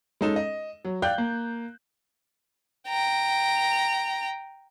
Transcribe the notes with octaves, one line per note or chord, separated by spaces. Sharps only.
G#3 C#4 D#4 A4 E7
D#5
F#3
D5 F5 G5 F#6 G6
A#3
G5 A#5